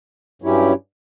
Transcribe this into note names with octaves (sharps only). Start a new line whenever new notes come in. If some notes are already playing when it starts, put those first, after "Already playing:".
G2 F#3 C#4 E4 G4